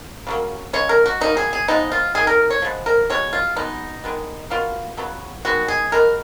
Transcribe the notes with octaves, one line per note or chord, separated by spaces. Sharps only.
C#3 F#3 A#3
C#3 G#3 C#5
A#4
F#4
B2 A#3 D#4
G#4
G#4
F3 G#3 B3 D#4
F4
D#3 A#3 G#4
A#4
C#5
F3 G#3 B3
A#4
B2 G#3 C#5
F4
B2 G#3 B3 D#4
D#3 G#3 B3
B2 A#3 F4
C#3 F#3 B3
D#3 G#3 B3 F#4
G#4
B2 G#3 B3 A#4